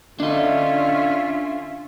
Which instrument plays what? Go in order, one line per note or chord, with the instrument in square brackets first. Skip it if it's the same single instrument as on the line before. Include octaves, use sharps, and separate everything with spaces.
[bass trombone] D3 [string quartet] C#4 F4 E5 [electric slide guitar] D4 D#5